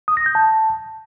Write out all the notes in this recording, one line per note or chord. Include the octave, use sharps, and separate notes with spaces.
D#6
A#6
G6
A5